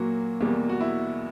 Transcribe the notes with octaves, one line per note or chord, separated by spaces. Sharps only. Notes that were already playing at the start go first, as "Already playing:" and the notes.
Already playing: A#2 F#3 A#3 F#4
E2 B2 G3 A#3
F#4
E4